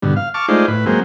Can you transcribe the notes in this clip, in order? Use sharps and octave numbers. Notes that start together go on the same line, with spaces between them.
G2 B2 D3
F5
A5 C#6 D6 F6
G#3 A3 D#4 F4 C5 D5
A2 B4
F#3 G#3 A#3 C4